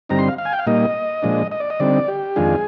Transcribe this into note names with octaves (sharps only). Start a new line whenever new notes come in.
G2 D3 G3 C4 D#4 A#5
C6
F5
F5
G#5
G5
F5
A#2 G3 A#3 D#4 D#5
A#2 F3 G#3 D4
D#5
D5
D#5
D3 G3 C4 D#4 D5
G4
F2 D#3 G#3 D4 F4 G#4